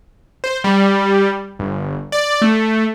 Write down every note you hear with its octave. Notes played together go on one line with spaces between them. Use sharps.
C5
G3
G1
D5
A3